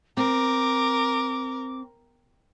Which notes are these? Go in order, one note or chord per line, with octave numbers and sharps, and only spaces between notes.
C4 A#4 D6